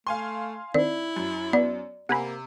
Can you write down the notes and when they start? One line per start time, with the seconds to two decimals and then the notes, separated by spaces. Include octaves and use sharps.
0.07 A3 F5 G#5 C6
0.74 D#3 C4 E4 D5
1.16 F#2
1.53 B3 D5
2.09 C3 A#3 F#5 G#5 B5